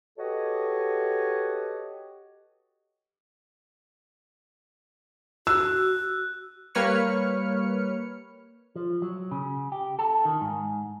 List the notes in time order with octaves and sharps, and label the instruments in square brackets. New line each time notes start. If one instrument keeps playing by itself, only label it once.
[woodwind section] F#4 G4 A4 B4 C#5 D#5
[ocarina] F#4 [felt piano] E6 [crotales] F#6
[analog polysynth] G3 A#3 B4 C#5 F6 C#7
[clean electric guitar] F3
F#3
C#3
G4
A4
D#3
G#2